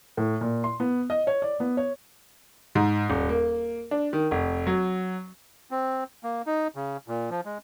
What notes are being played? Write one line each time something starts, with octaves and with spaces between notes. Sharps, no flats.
A2
A#2
C6
B3
D#5
C#5
D5
B3
C#5
G#2
D#1
A#3
D4
D#3
F1
F#3
C4
A#3
D#4
C#3
A#2
F3
G#3